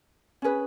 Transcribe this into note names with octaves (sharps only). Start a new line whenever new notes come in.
C#4 G#4 B4